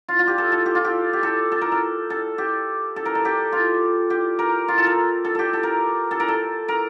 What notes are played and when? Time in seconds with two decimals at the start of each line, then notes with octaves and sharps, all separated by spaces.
0.08 F4
0.19 F4
0.27 G4
0.38 A4
0.52 A4
0.66 G4
0.75 F4
0.84 G4
1.13 G4
1.23 A4
1.52 A4
1.61 A#4
1.72 A4
2.10 A4
2.38 G4
2.96 A4
3.05 A#4
3.15 A4
3.25 G4
3.52 F4
4.10 G4
4.39 A#4
4.68 F4
4.78 A4
4.86 A#4
5.25 A4
5.35 G4 A4
5.53 A4
5.63 A#4
6.11 A4
6.20 A#4
6.28 A4
6.68 A#4